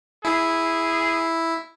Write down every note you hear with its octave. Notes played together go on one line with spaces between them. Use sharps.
E4 G#4